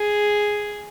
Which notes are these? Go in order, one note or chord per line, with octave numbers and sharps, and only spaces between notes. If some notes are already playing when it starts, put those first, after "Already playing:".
Already playing: G#4